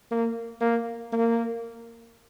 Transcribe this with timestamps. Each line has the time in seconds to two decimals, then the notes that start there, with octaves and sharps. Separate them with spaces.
0.11 A#3
0.61 A#3
1.12 A#3